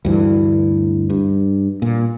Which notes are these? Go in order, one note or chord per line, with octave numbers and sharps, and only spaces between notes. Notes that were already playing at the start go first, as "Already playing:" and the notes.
D2 G2 E3
G2
A#2